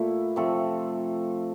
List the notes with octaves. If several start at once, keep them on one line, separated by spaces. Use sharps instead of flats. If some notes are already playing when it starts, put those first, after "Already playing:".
Already playing: A#2 A3 E4
C3 F3 A3 A4